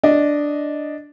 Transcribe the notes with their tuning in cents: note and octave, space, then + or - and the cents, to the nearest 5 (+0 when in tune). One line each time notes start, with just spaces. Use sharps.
D4 +0 D#5 +0